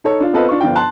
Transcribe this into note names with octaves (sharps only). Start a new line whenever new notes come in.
D#4 A4 C#5
D4 F4
B3 C4 F4 A4 B4 D#5
D4 F4 C#6
G1 F3 D4 F4 G5
A5 C6 F#6